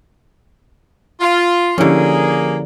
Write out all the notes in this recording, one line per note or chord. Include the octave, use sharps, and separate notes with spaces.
F4
D3 F3 A#3 C#4 E4 G4 G#4